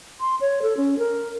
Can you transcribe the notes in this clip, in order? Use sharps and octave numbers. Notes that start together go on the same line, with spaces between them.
C6
C#5
A4
C#4
A#4